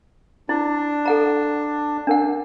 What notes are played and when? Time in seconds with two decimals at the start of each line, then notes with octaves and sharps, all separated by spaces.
0.49 D4 E4
1.05 A4 F#5 A#5
2.07 D4 A#4 F#5